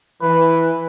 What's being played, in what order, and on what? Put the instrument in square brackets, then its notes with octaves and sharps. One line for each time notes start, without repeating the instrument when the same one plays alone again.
[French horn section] E3 [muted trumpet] B4